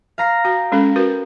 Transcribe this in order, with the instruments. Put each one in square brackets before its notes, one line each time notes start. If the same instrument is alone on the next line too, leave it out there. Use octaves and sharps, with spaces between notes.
[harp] F5 A#5 C7
[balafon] F#4 [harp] G5
[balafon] G#3 C#4 A4
F#4 A#4 B4